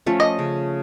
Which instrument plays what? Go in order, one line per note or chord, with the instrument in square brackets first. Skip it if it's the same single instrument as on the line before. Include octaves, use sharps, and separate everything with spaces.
[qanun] F3 A3 C#4
[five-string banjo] D#5
[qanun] C#3